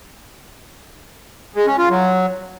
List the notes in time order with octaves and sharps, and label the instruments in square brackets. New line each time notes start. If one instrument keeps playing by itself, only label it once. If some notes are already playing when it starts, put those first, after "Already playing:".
[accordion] G#3
C#4
F4
F#3